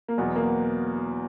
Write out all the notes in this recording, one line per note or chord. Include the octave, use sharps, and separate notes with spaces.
A#3
E2 B2 F#3 B3
A#3